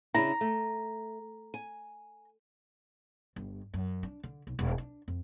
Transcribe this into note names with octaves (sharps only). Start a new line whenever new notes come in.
C#3 D4 E4 A#5
A3
G#5
G1
F#2
D4
D3
B1
E1
D4
F2